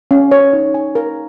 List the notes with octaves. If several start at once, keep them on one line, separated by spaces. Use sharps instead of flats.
C#4
C#5
D#4
G#5
A#4